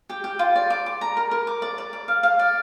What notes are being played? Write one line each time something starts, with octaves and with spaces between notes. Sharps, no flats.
G4
G4
F4
D5
D6
D6
A#5
A#4
A#4
D6
D5
D5
D6
F5
F5
D5